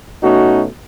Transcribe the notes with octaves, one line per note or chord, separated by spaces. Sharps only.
B2 A3 C#4 D#4 F#4